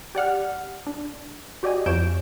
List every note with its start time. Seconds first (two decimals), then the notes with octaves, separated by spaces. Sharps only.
0.15 G4 D5 F#5 F6
0.87 D4
1.63 F#4 G4 D5 D#5 G#5
1.86 F2 C#5 G6 D7 E7